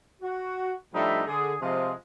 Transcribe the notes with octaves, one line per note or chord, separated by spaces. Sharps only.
F#4
A2 F3 G3 D4 D#4 E5
D3 G#4
C3 F3 G#3